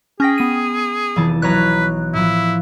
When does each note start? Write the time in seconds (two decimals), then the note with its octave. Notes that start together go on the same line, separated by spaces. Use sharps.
0.20 C#4 G#4 G5 G6 A#6 B6
0.38 B3 D#7
1.16 F1 E3 A5
1.42 B1 B4 C#5 A#5 F#6
2.13 A2 F3 E4